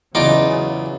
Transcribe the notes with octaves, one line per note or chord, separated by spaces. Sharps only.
E2 C#3 F#3 D#4 F4 D6